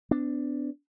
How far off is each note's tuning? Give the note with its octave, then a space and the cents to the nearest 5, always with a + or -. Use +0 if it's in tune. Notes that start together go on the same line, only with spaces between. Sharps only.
B3 +40 D4 +0